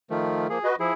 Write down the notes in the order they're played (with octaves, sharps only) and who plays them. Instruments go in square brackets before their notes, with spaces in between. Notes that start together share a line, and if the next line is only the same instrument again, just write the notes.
[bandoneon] D#3 F3 A3
[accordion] F3 A#3 [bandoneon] G#4
[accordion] F#4 B4 D#5
[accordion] F3 [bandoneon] E4 G#4